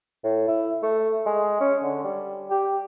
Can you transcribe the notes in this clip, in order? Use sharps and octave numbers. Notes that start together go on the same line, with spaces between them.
A2
E4
A3
G#3
C#4
D3
G3
G4